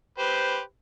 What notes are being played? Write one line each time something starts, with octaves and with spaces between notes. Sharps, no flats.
G4 B4 C5